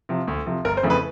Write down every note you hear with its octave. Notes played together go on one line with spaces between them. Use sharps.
C3 F3
D2
C3 F3
G1 A#4
C5
F2 C#3 E3 A3
B4